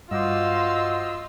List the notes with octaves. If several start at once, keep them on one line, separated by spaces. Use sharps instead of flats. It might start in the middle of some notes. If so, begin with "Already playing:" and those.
G2 F4 F#4 C5 D#5 C6 D6 E6